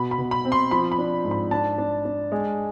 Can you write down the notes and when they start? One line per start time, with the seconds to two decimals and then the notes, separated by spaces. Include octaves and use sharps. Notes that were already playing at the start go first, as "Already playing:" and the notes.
Already playing: B2 B5
0.11 B5
0.18 B2
0.31 B5
0.45 C4
0.52 C6
0.71 F3 B5
0.92 B5
0.98 D4
1.25 G#2
1.31 B5
1.51 D4 A5
1.78 D4
2.05 D4
2.32 G#3